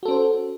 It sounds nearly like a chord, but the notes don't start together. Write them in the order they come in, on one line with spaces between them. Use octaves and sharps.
F#4 A4 C#4 C5